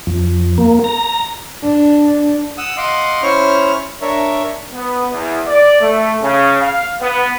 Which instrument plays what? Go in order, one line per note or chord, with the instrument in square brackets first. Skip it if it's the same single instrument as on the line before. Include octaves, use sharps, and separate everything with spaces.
[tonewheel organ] F2
A#3
A#5
[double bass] D4
[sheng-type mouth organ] F#5 D#6 E6
D#5 F5 F#5 C6 D6
C#4 E4 C5 C#5 C#6 F6
D4 A#4 C#5 E5
[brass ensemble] B3
E2
D5
A3
C#3
F5
B3